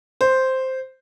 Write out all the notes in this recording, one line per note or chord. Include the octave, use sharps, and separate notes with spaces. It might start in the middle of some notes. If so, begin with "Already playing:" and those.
C5